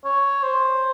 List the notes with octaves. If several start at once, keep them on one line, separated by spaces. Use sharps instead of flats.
C#5
C5